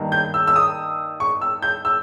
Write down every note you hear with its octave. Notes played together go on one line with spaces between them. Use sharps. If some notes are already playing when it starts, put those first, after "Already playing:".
Already playing: G2 D#3 A#3
G6
E6
E6
D#6
C#6
E6
G6
E6